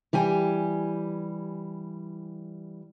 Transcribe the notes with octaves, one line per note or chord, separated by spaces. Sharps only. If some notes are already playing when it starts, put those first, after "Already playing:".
E3 G3 G4 G#5